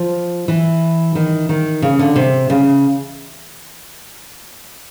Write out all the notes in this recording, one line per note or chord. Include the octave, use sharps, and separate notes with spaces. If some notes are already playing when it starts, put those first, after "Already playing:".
Already playing: F3
E3
D#3
D#3
C#3
D3
C3
C#3